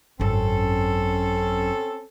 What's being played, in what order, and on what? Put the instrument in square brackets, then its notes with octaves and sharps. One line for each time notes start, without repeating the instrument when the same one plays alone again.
[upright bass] G#1 F#2 [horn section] C4 C#4 A4